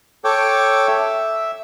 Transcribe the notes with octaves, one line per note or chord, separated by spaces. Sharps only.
A4 C#5 G5 D6
E5